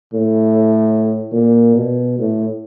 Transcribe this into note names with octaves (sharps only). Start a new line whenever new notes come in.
A2
A#2
B2
A2